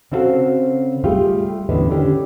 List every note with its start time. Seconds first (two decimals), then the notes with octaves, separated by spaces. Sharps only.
0.11 C#3 C4 E4 F#4 A4 F5
1.04 G3 A3 F4 G4 G#4
1.69 E2 A2 D3 C#4 B4 D#5
1.91 D3 D#3 C#4 G4